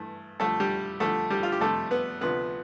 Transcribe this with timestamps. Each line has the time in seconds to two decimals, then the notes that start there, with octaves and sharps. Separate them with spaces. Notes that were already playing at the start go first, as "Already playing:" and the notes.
Already playing: G2 E3 A3
0.40 F2 D3 G3 A3 A4
0.60 G3 G4
1.00 F2 D3 G3 A3 A4
1.30 G3 G4
1.43 F4
1.52 G4
1.61 F2 C3 G3 A3 A4
1.91 B3 B4
2.21 D2 C3 F3 B3 B4